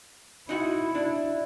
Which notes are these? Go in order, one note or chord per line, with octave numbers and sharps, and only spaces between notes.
D#4 E4 F#4 F#5
D4